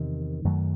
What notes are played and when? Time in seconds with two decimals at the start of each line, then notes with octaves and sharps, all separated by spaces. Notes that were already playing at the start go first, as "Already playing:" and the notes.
Already playing: E2 C3 D#3
0.45 F#2 D#3 F#3 A3